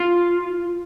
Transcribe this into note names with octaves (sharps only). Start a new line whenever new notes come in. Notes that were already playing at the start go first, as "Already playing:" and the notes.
Already playing: F4